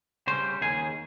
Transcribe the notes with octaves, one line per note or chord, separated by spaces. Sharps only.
C#3 G3 C5
D#2 G#4